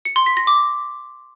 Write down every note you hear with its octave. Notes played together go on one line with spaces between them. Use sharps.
C#7
C6
B6
A#6
D6